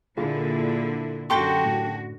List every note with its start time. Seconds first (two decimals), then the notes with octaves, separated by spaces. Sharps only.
0.17 A#2 D3 E4 F4 G#4
1.30 F#2 D3 F#4 G4 A4 G5 C6 C#6
1.65 A2